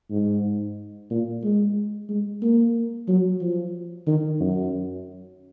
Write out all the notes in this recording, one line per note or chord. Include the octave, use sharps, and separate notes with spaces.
G#2
A#2
G#3
G#3
A#3
F#3
F3
D#3
F#2